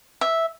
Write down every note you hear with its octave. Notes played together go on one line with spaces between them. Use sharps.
E5